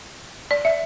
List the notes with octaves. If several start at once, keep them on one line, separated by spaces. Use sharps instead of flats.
D5
E5